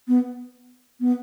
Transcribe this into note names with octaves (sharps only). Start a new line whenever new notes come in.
B3
B3